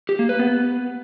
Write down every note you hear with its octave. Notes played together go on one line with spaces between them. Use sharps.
G4
A#3
B4
B3